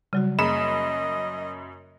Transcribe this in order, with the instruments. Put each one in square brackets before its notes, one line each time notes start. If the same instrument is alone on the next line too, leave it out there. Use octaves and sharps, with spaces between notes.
[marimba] C#3 F#3 F#4 [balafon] G3
[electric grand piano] F#2 B5 E7 [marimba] A#3 G#4 [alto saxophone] D#5